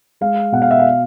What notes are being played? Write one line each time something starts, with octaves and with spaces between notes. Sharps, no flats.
G#3 F5
B2 F#5
F5
E5
F5